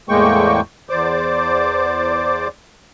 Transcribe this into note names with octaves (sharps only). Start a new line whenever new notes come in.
E2 A2 G#3 A#3 G5 C#6
E2 C5 D5 D6